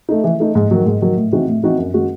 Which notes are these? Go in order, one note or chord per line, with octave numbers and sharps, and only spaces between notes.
A3 D#4
E3
A3 D#4
G#2
D#3 F#3
G#2
D#3 F#3
A2
E3 C4 D#4 F#4
A2
E3 C4 D#4 F#4
F#2
D#3 G#3 C#4 F#4